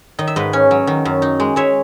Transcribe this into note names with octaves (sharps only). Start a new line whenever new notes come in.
D#3 D#5
E5
G#2 B4 D#5
C#4
F#3
D#3
F#2
D#4
G#3
G#3 C#5 E5